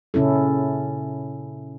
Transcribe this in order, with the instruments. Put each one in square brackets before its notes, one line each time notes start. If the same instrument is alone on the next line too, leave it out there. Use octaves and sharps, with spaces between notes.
[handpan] A#2 C#3 C#4 E4 A4